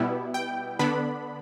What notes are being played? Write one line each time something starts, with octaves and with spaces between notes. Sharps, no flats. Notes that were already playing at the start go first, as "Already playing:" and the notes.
Already playing: B2 G3 B3 E4
G5
D3 B3 D4 B5